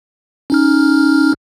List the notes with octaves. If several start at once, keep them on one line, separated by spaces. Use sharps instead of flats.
C#4 D#4 F6